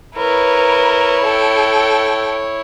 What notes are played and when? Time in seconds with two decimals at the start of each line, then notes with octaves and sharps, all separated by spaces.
0.17 E4 A#4 B4 C#5
1.25 A4 G5